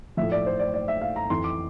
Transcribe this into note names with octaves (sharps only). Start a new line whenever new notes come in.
A2 F3 E5
D5
C5
D5
D5
E5
F5
A#5
F2 E3 C6
D6